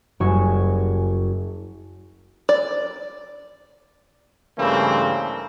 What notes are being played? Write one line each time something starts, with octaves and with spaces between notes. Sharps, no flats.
F#1 G3 F#4 G#5 C#6 E7
D5
G2 C#3 E3 A3 A#3 C4